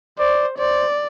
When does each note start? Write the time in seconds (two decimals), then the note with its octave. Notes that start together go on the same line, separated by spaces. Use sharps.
0.19 C5 D5
0.58 C5 D5